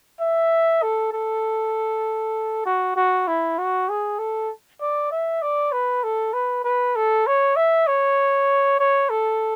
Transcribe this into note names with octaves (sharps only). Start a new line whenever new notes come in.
E5
A4
A4
F#4
F#4
E4
F#4
G#4
A4
D5
E5
D5
B4
A4
B4
B4
A4
C#5
E5
C#5
C#5
A4